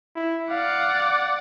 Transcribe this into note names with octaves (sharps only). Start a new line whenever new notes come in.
E4
D5 F5 F#5